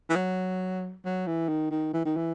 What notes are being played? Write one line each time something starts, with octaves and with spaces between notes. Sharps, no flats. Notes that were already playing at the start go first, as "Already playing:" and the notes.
E3
F#3
F#3
E3
D#3
D#3
E3
D#3
E3